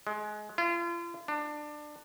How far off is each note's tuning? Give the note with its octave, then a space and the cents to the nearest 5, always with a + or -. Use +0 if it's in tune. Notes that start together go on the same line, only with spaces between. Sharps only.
G#3 +25
F4 -40
D4 +20